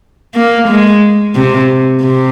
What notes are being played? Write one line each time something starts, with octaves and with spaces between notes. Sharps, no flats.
A#3
G#3
C3
C3